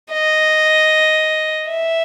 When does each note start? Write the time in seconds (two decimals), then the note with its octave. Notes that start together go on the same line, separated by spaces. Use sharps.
0.12 D#5
1.69 E5